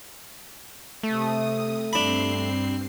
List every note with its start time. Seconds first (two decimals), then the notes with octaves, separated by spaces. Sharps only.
1.03 C3 A3 D#6
1.93 G2 C4 D4 B5 C7